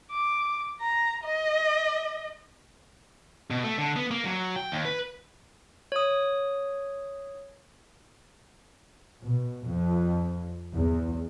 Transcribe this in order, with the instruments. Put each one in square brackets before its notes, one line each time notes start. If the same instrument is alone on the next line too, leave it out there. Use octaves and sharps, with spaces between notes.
[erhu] D6
A#5
D#5
[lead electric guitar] B2
A3
D3
B3
A#3
F#3
G5
D#2
B4
[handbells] C#5 D#6
[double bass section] B2
F2
E2